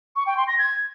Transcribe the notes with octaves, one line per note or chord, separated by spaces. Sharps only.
C#6
G5
C6
A#6
G#6